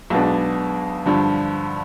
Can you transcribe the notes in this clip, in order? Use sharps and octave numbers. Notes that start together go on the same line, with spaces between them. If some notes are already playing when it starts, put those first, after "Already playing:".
B1 B2 G#3 B3 D4
G2 D3 F3